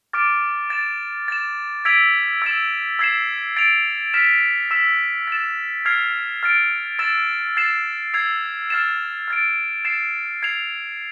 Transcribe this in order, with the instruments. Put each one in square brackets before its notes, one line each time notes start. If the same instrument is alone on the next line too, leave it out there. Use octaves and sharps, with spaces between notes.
[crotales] D6 F6 A6 D7
A6 E7
A6 E7
E6 G#6 B6 D7 F7
E6 A6 E7
E6 G#6 C7 E7
A6 D7 F7
F6 B6 E7
E6 B6 E7
A6 E7
F6 G#6 C7 F7
F6 A6 D7
E6 A6 E7
A6 C7 E7
E6 G#6 C7 F7
F6 A6 C7 E7
F6 A6 D7
A6 C7 E7
G#6 C7 F7